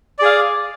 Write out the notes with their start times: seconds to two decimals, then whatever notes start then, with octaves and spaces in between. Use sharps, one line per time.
0.19 D5
0.22 G#4
0.25 F5